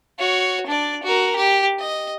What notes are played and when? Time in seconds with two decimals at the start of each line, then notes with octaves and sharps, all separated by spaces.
0.19 F#4 C#5
0.66 D4 D5
1.03 F#4 A#4
1.36 G4
1.79 D#5